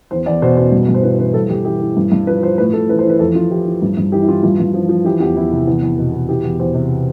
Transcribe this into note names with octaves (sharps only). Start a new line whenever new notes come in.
E2 C5
E2 D5
B2 C5
B2 C5
G2
G2
C5
E3 B4
E3 B4
G2 A4
G2 G4
E3 G4
E3
G2
G2
F3 B4
F3 C5
A2 B4
A2 A4
E3 B4
C5
E3 B4
F2 A4
F2 F4
E3 G4
E3
G2
G2
E3 G4
E4
E3 F4
G2 F4
G2
F3
F3
E3 G4
E2 G4
E2 E4
C3
E2
E2
B2
B2
E3 G4
E2
E2 C5
C3